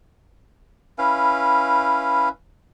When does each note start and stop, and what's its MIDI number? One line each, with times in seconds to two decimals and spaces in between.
0.98 2.29 61
0.98 2.29 64
0.98 2.29 71
0.98 2.29 77